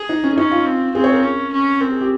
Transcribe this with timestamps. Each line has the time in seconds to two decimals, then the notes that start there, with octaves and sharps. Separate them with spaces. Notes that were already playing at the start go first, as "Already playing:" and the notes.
Already playing: G#4
0.09 D#4
0.24 C#4
0.37 C#4 D#4
0.51 F4
0.66 C4
0.94 C4 G#4
1.04 C#5
1.13 A#4
1.23 C#4
1.52 C#4
1.80 C4 A#4
1.90 G#4
2.01 G4